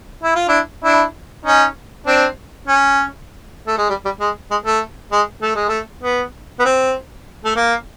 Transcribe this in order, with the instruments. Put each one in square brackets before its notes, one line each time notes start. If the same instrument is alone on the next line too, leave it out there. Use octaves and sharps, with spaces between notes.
[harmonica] E4
F4
D4 E4
D4 E4
C#4 D#4
C4 D4
C#4
A3
G#3
G3
G3
G#3
G#3
A3
G#3
A3
G#3
A3
B3
B3
C4
A3
A#3